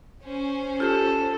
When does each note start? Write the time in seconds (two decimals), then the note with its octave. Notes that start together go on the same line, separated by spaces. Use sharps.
0.22 C#4 C5
0.80 F4 G4 A4